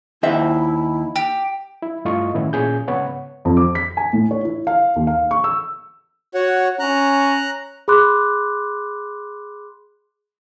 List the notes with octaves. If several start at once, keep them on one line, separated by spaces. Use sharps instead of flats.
D#2 E4 C5 E5
G4
E4
G2 A3 E4 F4 D#5 C#6
A2 D#3 B3 C#4 E4
A#2 C#4 G#4 G6
G#2 C#3 B3 C#5 F#5
F2
D6
B6
G#5
A2
C#5
E4
F5
D#2
F5
C#6
E6
F#4 C#5 F#5
C#4 A#5 F#6
G#4 B5 C6 D6 F#6